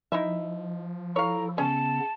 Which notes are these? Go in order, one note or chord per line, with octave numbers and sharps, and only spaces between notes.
F3 D#4 E4 E5
E4 A4 C#5 F5 A#5
C#3 B3 C#4 A5